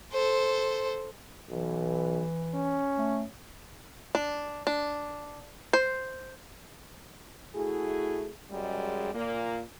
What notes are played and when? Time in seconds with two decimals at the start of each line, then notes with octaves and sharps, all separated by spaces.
0.13 A4 C5
1.50 B1 E3
2.55 C#4
2.98 A3
4.15 D4
4.67 D4
5.73 C5
7.56 A3 E4 F#4 G#4
8.51 F#2 G3 G#3
9.14 A#2 A#3